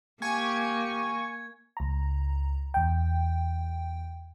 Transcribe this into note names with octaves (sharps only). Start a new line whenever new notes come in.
A#3 G4 G#5 C#6 G#6
C#2 A#5
E2 G5